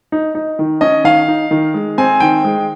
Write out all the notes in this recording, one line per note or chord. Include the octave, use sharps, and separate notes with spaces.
D#4
D#4
D#3
C#4 D#5
D#3 F5
D#4
D#3
G#3
C4 G#5
D#3 G5
G#3